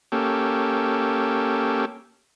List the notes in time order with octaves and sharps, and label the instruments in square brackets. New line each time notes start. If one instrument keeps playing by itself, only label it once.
[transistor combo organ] A#3 C#4 G4 A4